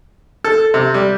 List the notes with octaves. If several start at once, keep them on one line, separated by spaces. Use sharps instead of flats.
A4
C3
G3